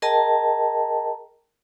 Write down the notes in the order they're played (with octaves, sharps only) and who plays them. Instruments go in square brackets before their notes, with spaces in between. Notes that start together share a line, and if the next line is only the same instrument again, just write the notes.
[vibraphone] G#4 A#4 D#5 G5 A5 A#5